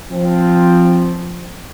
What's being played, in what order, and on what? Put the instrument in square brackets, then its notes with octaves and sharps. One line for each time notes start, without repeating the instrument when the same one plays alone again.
[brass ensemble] F3 C4